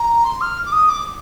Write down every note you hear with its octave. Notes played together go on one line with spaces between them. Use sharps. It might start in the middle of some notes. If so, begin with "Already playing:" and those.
Already playing: A#5
C6
F6
D6
D#6
D6